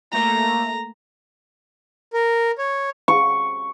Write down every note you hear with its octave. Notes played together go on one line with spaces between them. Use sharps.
A3 A#3 A#5
A#4
C#5
C#6